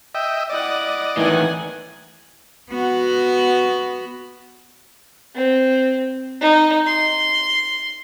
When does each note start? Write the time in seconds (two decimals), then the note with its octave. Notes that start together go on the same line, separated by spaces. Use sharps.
0.15 D#5 E5 G5
0.50 E4 D5 D#5 F#5
1.17 A2 D#3 E3 F#5 G#5
2.70 B3 F#4
5.35 C4
6.41 D#4
6.87 C6